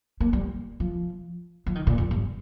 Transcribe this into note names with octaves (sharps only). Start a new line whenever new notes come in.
A#3
G3
F3
F3
D#3
A#2
F2
G2